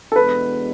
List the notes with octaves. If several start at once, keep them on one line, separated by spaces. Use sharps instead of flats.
A4
E2 B2 G#3 B3 D4 B4